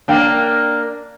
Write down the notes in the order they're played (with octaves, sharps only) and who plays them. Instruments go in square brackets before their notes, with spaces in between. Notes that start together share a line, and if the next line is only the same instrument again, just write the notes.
[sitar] A#3 D4 [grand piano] G5